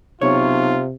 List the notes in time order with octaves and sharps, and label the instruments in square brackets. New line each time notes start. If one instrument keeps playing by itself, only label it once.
[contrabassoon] B1 [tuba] C3 [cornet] F4 [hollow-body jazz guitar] C#5